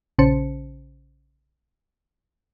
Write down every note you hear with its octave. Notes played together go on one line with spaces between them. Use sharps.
A#1 C#3 C#4 C5 A5 C#7